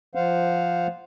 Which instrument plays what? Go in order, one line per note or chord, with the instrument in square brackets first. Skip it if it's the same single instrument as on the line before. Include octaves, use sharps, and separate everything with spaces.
[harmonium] F3 C5 F5 F#5